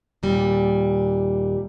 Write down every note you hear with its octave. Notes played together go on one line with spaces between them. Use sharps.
D#2 A#2 G3